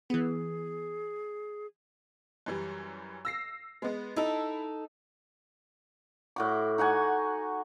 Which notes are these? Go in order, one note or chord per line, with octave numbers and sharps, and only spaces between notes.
E3 B3 G#4
F#2 E3 G3
E6 A#6 C7
G#3 B3
D#4 E4 A4
A2 F#4 D6
D#4 F#4 F#5 G#5